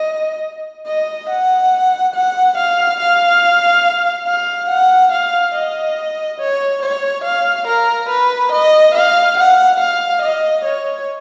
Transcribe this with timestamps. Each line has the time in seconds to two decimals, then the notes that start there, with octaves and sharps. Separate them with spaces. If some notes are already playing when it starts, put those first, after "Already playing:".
Already playing: D#5
0.87 D#5
1.29 F#5
2.15 F#5
2.57 F5
3.00 F5
4.27 F5
4.70 F#5
5.12 F5
5.55 D#5
6.40 C#5
6.83 C#5
7.24 F5
7.67 A#4
8.09 B4
8.52 D#5
8.95 F5
9.37 F#5
9.80 F5
10.22 D#5
10.65 C#5